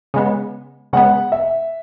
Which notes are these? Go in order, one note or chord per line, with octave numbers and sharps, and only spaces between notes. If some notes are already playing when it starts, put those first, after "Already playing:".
C#3 G#3 B3
C#3 G#3 B3 F#5
E5